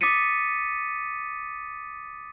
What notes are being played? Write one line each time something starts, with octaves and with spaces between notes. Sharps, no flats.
D6 D#6 A6 B6 C#7 D#7